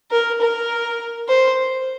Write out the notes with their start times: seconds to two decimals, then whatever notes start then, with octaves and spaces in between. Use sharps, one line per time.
0.11 A#4
0.41 A#4
1.28 C5